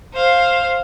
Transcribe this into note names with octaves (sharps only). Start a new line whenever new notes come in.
C5 F5